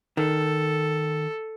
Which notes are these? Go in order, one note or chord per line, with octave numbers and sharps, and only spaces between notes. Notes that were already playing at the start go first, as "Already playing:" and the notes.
D#3 A4